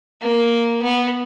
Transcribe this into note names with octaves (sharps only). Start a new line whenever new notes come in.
A#3
B3